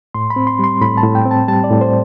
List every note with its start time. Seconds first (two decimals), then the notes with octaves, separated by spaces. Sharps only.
0.14 A2 C6
0.30 B5
0.36 C4
0.47 C6
0.59 G3 C6
0.81 A2 B5
0.98 A5
1.03 A2
1.15 G5
1.26 C4
1.31 A5
1.48 G3 A5
1.64 D5
1.70 A2
1.81 C5